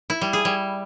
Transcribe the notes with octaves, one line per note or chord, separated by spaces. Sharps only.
E4
G3
G#4
G3